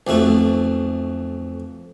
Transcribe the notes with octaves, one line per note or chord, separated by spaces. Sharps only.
B1 F2 A3 F#4